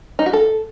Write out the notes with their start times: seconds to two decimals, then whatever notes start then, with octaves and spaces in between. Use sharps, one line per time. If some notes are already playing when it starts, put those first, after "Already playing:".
0.19 D#4
0.26 F#4
0.33 A4